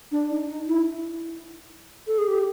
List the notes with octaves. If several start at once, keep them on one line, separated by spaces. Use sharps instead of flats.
D4
D#4
D#4
E4
A4
G#4
G4